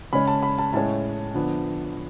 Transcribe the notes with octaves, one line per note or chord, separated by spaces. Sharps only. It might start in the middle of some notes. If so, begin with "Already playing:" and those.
C#3 G#3 C#4 B5
A5
B5
A5
A2 G#3 C#4 A5
D3 F3 B3 D4